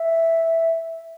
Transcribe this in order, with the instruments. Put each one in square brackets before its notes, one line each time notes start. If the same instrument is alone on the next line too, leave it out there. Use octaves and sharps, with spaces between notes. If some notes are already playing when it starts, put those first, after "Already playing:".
Already playing: [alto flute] E5